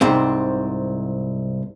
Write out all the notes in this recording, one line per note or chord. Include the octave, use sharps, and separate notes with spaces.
C2 G#2 C4